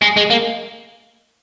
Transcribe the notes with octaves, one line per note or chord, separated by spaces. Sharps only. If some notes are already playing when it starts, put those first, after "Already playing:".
G#3
G#3
A#3